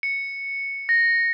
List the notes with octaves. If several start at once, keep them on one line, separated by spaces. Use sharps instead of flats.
C#7
A#6